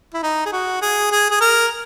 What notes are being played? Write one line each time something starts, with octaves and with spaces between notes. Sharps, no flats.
E4
D#4
G#4
F#4
G#4
G#4
G#4
A#4